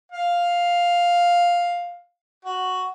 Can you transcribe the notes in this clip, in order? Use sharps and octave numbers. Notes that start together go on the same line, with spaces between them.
F5
F#4